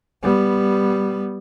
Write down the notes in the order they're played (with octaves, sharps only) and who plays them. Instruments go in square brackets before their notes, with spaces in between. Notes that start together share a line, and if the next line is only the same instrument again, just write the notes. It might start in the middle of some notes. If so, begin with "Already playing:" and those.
[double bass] G3 B3